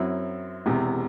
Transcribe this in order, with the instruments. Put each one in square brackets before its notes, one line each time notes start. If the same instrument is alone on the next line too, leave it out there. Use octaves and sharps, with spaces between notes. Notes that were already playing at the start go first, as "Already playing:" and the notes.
Already playing: [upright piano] F#2 F#3 C4 E4
E1 E2 C3